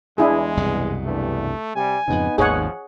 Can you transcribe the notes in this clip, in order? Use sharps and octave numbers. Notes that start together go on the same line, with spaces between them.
E2 G#3 D4 E4 G#4
C2 F#2 B2
E2 G2 A3
C3 G3 G#5
F2 G#2 C#3 B3 D#4
G#1 D#2 F3 G#4 C#5 F#5